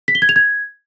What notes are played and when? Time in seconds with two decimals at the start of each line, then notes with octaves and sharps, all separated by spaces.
0.08 B6
0.15 G7
0.22 G#6
0.29 F7
0.36 G#6